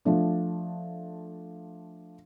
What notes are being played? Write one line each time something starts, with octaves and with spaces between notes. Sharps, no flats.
F3 A3 D4